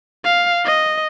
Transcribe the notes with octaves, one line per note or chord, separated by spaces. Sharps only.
F5
D#5